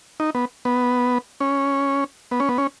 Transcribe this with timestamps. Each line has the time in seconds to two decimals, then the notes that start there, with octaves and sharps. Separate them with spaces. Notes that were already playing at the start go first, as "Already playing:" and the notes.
0.20 D#4
0.35 B3
0.65 B3
1.41 C#4
2.31 B3
2.40 C#4
2.49 B3
2.58 C#4